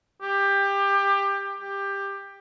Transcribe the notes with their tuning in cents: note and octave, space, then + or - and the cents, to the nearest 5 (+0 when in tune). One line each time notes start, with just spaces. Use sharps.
G4 +20
G4 +15